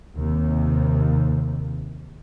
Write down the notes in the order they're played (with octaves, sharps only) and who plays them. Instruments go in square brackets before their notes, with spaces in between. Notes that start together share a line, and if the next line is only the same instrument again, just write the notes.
[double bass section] D#2 C3